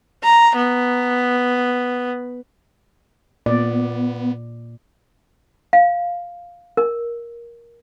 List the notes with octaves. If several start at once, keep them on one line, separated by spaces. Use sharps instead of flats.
A#5
B3
A#2 B3 D5
F5
A#4